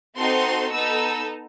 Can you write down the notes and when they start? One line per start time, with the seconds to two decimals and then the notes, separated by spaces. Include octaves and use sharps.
0.16 C4 D#4 F#4 A4 C6
0.71 B3 D#4 A4 E6